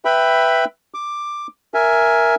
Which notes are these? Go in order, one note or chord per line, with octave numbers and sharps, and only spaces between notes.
B4 E5 G5 B5
D6
A#4 E5 G#5